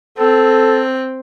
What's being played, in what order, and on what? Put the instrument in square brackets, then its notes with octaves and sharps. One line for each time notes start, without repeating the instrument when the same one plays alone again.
[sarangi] C4 [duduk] A4